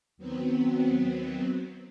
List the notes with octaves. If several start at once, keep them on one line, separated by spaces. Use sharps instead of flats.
D#2 F#3 B3 C4